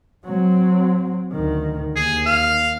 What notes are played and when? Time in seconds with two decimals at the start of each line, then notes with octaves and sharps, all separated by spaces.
0.25 F#3 C4
1.32 D2 D#3
1.96 D#2 G#4
2.26 F5